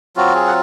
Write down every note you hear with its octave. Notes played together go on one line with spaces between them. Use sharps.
F#3 C4 F4 F#4
G#4
F#5